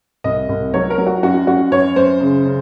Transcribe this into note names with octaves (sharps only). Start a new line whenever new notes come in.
C2 D#5
C2
F#3 C#5
A#4
F#3
F#4
F#2 F#4
F#2 F#4
F#2 C#5
F#2 C5
C#3
C#3